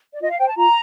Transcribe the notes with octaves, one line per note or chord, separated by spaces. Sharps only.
D5
F4 D#5
F5
C5 G5
A5
F4 A#5